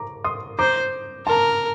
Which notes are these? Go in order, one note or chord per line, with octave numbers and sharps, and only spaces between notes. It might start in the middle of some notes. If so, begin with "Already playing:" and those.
Already playing: A#5 D6
C6 D#6
C5 A#5 D6
A#4 A5 C6